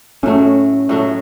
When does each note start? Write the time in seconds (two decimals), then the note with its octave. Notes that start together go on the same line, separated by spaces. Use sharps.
0.23 A2 F#3 A3 C#4
0.89 A2 F#3 A3